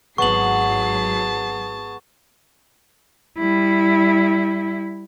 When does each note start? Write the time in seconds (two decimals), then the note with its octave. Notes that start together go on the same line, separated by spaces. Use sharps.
0.18 G#1 F#3 B3 G#4 A5 C#6 C7 F#7
3.38 G3 E4